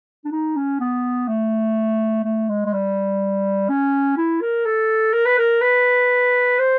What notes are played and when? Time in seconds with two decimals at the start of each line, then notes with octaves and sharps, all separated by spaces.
0.25 D4
0.32 D#4
0.56 C#4
0.80 B3
1.28 A3
2.24 A3
2.49 G#3
2.66 G#3
2.73 G3
3.69 C#4
4.17 E4
4.41 A#4
4.66 A4
5.13 A#4
5.26 B4
5.38 A#4
5.61 B4
6.59 C5